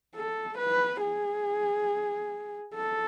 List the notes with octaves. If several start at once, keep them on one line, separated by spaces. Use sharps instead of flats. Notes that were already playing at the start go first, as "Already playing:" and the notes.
A4
B4
G#4
A4